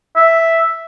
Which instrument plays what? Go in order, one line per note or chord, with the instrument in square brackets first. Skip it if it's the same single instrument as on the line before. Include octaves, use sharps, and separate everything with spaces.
[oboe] E5